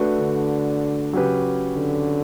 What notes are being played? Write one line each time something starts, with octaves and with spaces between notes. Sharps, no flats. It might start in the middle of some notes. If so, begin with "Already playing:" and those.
Already playing: A3 D4 F#4 B4
D3
C#3 F#3 C#4 G4 B4
D3